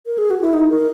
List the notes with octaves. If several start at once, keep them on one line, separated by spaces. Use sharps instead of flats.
A#4
G#4
F#4
E4
D#4
A#4